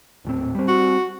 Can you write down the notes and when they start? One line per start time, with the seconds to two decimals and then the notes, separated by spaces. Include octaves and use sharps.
0.25 D#1 A2 C4
0.55 G3 C4
0.68 F#4